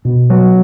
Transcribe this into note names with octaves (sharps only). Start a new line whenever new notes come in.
B2
F#3